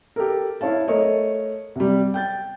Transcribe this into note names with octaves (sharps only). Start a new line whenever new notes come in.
G4 A4 A#4
E4 C#5 F5 A5
A3 A#4 C#5 D#5
C3 G3
G5 G6 A6